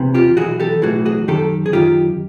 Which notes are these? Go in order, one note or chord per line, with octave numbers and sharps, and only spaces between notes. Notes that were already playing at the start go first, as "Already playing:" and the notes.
Already playing: E2 C3 E3
F4 G4
B1 A2 E3 F#4 G#4
G4 A4
B1 A2 E3 F#4 G#4
F#4 G#4
F#2 D#3 G4 A4
G#4
F#2 D#3 F4 G4